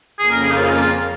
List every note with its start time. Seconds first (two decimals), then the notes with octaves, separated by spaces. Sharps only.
0.19 F2 C#3 A#3 G#4
0.31 A#4
0.44 G#4
0.51 D#4
0.56 F4
0.66 D#4
0.70 F4
0.81 F4